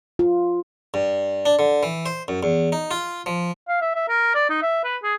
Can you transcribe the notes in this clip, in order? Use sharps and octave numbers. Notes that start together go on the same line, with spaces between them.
F4
G2
D4
D3
E3
C5
F#2
E2
D#4
F4
F3
F5
E5
E5
A#4
D5
D#4
E5
B4
G#4